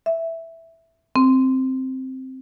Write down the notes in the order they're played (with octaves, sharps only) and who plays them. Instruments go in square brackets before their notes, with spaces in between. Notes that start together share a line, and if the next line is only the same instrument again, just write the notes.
[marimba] E5
C4